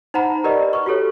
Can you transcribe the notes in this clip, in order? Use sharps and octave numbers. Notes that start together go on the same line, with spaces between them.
D#4 C5 F#5 A#5 B5
G4 A#4 B4 D5 D#5
B4 C#6
F#4 G4 A4 C#5